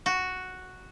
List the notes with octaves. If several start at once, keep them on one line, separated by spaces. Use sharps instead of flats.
F#4